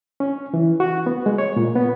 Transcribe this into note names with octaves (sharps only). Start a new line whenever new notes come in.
C#4
E3
F#4
B3
G#3
C#5
A#2
B3